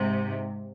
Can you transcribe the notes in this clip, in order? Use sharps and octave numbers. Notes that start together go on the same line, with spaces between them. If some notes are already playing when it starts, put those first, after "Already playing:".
Already playing: G#2 C3